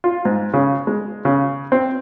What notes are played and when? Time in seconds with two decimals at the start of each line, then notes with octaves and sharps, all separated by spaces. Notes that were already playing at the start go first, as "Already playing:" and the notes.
0.04 F4
0.25 G#2
0.54 C#3
0.87 G#3
1.25 C#3
1.72 C4